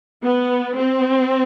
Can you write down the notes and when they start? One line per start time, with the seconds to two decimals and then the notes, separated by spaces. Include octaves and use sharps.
0.24 B3
0.78 C4